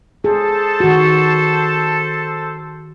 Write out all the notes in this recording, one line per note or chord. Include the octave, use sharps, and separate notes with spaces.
G#4 A4 C5 A5
D#3 F#4